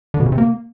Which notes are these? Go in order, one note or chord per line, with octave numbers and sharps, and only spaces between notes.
D3
B2
C#3
C3
A#3